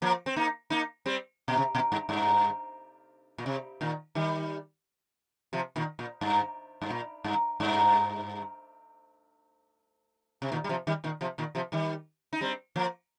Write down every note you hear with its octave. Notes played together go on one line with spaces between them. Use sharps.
F3 A#3
C4
A#3 D#4
A#3 D#4
G3 C4
A#2
C3
A#2
G2
G2
A#2
C3
A#2 D#3
D#3 G3
C3 F3
A#2 D#3
A#2
G2
G2
A#2
G2
G2
C3
A#2 D#3
G3
C3 F3
D#3 G3
A#2 D#3
C3 F3
A#2 D#3
C3 F3
D#3 G3
D#4
G3 C4
F3 A#3